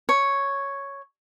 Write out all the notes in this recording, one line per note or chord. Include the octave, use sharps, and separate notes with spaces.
C#5